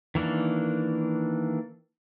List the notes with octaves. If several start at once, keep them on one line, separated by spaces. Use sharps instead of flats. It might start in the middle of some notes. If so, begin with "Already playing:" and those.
D#3 E3 A#3 D4